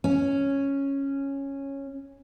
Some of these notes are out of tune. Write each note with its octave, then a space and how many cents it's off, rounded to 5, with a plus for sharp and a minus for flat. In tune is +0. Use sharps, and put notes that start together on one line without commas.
C#4 -5